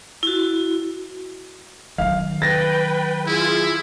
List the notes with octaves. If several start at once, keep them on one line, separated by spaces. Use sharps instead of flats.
E4 F#4
D#3 F#3 F5
B4 G5 A6 A#6
E4 F4 G#4